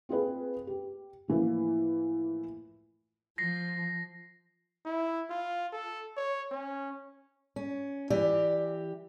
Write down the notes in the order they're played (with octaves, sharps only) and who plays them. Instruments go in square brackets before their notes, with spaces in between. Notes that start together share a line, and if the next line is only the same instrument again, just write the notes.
[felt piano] C4 F4 G#4 B4
G4
A2 E3 F3 A#3
[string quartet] F3 [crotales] A#6 C7
[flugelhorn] E4
F4
A4
C#5
C#4
[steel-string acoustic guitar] C#4
E3 G4 D5